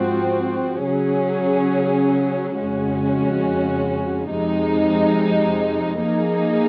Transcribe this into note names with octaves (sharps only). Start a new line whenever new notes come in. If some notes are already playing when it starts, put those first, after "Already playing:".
Already playing: G#2 F3 C4 F#4
C#3 F#3 C#4 G#4
F2 C#3 G#3 C#4 F#4
F2 C3 F3 G#3 D#4
F3 A#3 D#4 G#4